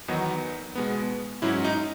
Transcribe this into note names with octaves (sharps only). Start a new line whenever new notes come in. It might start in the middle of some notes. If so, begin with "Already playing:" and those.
E2 D#3 F#3 B3 D#4
B2 G#3 B3
G#2 F#3 C#4 E4
D#4